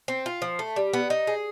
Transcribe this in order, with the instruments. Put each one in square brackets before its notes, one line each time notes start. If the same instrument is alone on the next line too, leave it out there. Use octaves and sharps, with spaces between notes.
[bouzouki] C4
F4
F3
A3
G3
B3
D#4
G#4